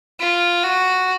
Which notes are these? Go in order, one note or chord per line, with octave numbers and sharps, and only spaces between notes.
F4
F#4